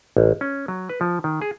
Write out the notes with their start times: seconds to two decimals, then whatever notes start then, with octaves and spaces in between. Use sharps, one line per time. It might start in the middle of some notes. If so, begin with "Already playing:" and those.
0.17 A1
0.41 C#4
0.68 F#3
0.89 B4
1.01 F3
1.24 D#3
1.41 G#4